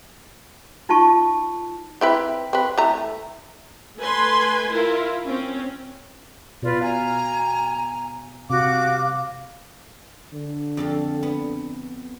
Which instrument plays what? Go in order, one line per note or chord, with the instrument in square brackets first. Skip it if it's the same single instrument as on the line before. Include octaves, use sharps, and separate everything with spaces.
[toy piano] D#4 F4 A5 C#6
[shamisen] C4 E4 B4
C4 B4
A3 E4 A#5
[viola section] A3 B4 G#5 C6
E4 F4 A#4
C4 C#4
[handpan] B2 [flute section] F4 B4 D5
[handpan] F5 [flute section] G#5 [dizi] A#5
[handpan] C3 [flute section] F#4 F#5 [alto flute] F5 [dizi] D6
[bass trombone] D3
[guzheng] F2 A4 F5
B3